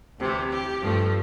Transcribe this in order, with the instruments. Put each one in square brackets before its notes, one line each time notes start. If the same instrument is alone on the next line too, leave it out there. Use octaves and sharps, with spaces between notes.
[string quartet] D2 C3 E3
G4
G2 F3 A3